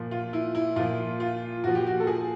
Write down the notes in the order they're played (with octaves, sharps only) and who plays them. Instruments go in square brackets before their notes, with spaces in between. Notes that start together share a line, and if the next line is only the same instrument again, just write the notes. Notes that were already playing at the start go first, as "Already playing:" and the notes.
Already playing: [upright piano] A#2 F3
F4
E4
E4
A#2 F3 F4
F4
A#2 F3 F#4
G4
F#4
A4
G#4